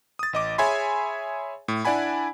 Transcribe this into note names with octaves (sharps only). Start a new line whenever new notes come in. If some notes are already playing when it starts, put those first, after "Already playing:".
D#6 A6
A1 D#5 D6
G#4 C#5 E5 G#5 B5 C6
A2
D4 E4 D5 F#5 G#5 B5